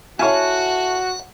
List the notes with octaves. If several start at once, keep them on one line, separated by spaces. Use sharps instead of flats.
E4 F#4 A4 C#5 F5 F#5 G#5